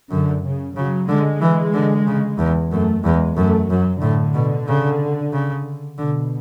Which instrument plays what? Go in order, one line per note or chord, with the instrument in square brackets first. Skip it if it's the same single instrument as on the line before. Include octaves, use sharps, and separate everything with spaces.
[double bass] F#2 [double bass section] D3
[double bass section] C#3
[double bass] C#3 [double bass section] F#3
[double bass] D3 [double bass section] G#3
[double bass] E3
D3
C#3
E2
[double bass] F#2 [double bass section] A3
[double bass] E2 [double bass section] G#3
[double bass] F#2 [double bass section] A3
[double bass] F#2 [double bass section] F#3
[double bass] A2 [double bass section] D3
[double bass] B2
C#3
C#3
[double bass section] B2 [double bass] D3